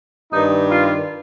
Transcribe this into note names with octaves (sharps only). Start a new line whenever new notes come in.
G2 D#3 D#4
F4